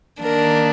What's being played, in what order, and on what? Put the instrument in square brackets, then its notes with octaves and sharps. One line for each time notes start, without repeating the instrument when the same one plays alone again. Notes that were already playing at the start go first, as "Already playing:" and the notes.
[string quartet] D#3 A#3 D4 A#4